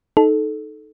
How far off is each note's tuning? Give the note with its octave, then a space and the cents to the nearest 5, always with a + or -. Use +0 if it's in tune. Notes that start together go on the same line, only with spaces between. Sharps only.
D#4 +0 A4 -15